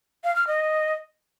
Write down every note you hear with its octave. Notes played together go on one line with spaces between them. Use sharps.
F5
F6
D#5